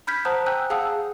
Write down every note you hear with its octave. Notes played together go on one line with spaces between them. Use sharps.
B5 F6 G6 G#6 B6
C5 F#5 A5 A#5 D#6 F#6
G5 G#5 A#5 E6 F#6 G6
G#4 F5 F#5 A5 D#6 E6